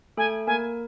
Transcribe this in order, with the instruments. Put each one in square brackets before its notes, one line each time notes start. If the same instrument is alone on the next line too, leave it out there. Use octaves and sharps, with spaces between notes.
[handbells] A3 A4 [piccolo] G#5
[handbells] A#3 A#4 [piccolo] G#5